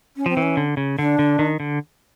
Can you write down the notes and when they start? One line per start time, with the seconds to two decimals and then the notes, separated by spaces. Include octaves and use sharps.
0.17 C#4
0.26 F3 C4
0.37 E3
0.43 C#4
0.57 D3
0.77 C#3
0.98 D3 D4
1.19 D3
1.39 D#3
1.60 D3